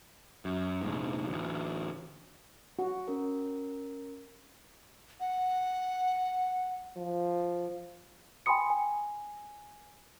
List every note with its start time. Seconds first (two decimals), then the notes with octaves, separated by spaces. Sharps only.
0.45 F#2
0.82 F1 A#1 G#2
1.27 A1 D2
2.79 F#4
3.08 C#4 A#4
5.20 F#5
6.96 F3
8.46 G5 G#5 B5 C6 D#6 C#7
8.70 G#5